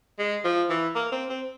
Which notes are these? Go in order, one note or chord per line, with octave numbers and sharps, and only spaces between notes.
G#3
F3
E3
A#3
C4
C4